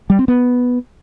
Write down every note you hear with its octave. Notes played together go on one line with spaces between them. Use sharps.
G3
C4
B3